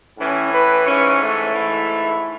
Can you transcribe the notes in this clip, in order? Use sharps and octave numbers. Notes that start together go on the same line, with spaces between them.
A2 E3 C#4
B4
G#2 E3 C#4
A3
G#2 E3